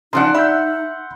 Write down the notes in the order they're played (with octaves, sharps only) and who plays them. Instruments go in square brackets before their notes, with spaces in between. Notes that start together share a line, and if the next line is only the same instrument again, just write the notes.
[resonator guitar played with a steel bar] C#3 F3 D4 [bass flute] D#4 [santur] F#5 C6
[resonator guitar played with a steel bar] E5 [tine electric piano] B5 E6 G6